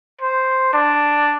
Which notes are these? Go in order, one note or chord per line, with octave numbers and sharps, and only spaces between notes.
C5
D4